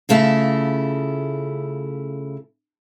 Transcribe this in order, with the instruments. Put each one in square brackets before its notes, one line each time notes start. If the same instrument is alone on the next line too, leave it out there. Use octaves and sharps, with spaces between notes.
[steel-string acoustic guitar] C#3 A3 E4 F4